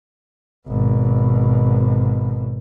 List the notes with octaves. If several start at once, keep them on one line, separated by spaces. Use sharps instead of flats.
G#1 B2